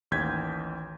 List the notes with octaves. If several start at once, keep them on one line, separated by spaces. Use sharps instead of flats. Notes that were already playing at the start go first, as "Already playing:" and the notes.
A1 D#2 G6 G#6 B6